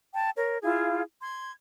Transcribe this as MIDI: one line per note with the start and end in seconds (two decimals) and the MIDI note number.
0.14 0.30 79
0.14 0.30 81
0.36 0.57 70
0.36 0.57 73
0.63 1.01 64
0.63 1.01 65
0.63 1.01 68
0.63 1.01 77
1.22 1.51 84
1.22 1.51 92